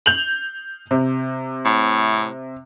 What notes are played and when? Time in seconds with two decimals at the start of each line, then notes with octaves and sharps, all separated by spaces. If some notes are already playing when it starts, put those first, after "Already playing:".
0.06 G6 F7 F#7
0.91 C3
1.65 A2